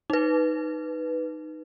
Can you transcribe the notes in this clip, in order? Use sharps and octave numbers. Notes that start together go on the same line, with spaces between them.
D#4 B4